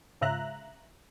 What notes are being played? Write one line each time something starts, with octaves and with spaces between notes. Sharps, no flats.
G#2 C#3 F4 E5 A#5 F#6